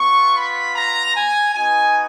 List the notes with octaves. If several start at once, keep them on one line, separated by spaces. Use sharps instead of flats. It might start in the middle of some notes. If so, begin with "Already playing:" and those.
Already playing: B3 F4 C#6
B5
A#5
G#5
B3 D#4 F#4 G#5